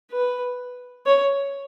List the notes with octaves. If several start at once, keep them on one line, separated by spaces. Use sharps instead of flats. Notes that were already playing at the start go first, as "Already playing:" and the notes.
B4
C#5